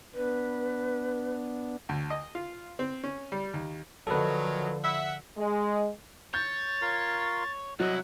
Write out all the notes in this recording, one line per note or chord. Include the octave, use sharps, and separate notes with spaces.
B3 D4 B4
D2
D#5
F4
C4
C#4
G3
D#2
D3 D#3 F3 F#3 A4 B4
E5 F#5
G#3
C#5 G6 A6
F4 A#4 C6
C2 F#3 E4 D#5 F#5